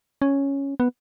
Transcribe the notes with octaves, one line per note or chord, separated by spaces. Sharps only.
C#4
B3